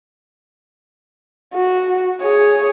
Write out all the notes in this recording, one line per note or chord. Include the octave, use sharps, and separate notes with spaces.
F#4
G#4 C#5